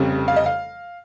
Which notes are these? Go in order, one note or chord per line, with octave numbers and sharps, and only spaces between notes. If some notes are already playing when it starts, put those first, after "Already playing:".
Already playing: F1 F2 C#3 G3
F5
D#5
F5